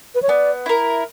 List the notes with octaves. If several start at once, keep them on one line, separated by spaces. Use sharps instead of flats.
B4
C#5
B3 D5
E4 A#4